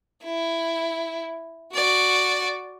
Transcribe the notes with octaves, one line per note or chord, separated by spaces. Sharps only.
E4
F#4 D5